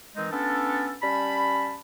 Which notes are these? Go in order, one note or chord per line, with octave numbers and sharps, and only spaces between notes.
D#3 E3 G#3 C4 D#4
B3 C#4 D4 F4 A4
G3 C#4 A5 B5